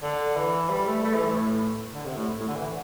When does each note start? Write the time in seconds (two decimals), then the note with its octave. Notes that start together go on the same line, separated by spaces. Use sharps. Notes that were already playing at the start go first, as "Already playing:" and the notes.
0.02 D3
0.36 E3
0.69 G3
0.87 A3
1.04 A3
1.15 E3
1.26 A2
1.94 D3
2.05 C3
2.17 A2
2.40 A2
2.47 D3
2.56 E3